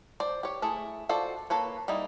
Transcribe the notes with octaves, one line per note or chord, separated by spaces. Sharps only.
C5 D5
G4 C#5
A3 E4 G#4
F4 F#4 A4 C5 D5
A#3 A4 B4 C#5
G3 A#3 D#4 E4